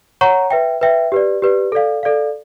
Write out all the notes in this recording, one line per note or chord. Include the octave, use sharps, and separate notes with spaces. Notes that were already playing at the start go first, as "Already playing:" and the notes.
C#5 F#5 A#5 C#6
B4 E5 G5
B4 E5 G5
G4 B4 D5
G4 B4 D5
A4 D5 F5
A4 D5 F5